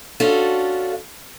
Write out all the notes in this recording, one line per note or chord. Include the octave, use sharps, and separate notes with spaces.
C#4 D4 F4 F#4 A4